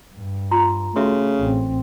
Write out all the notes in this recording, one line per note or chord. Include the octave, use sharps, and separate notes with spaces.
G2
F4 A#5 C6
C#3 A3 F#4 E5 C6
A1 C4